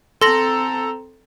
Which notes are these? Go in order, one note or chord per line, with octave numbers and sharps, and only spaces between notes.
C4 A4 A#5 C6 A#6 F#7